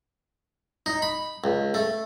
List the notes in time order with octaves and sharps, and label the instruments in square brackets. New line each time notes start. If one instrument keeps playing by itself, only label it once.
[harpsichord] D#4
B5
C#2
A3